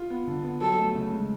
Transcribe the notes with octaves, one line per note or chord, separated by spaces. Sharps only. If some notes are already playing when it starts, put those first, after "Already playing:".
Already playing: F4
B3
D3
B3
F#3 A4
A3
C#3
G#3